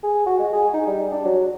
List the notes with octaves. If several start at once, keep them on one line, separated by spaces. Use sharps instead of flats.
G#4
F#4
G#3
G#4
D#4
G3
D4
F#3